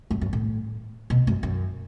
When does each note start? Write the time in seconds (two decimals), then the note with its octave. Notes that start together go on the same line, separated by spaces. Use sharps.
0.11 F#2
0.21 F#2
0.33 A2
1.10 B2
1.27 F#2
1.43 F#2